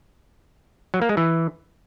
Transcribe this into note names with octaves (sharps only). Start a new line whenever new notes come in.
F#3
A#3
G#3
E3